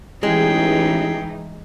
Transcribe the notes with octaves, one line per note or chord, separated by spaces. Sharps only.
A1 E3 G#3 D#4 G#4 G5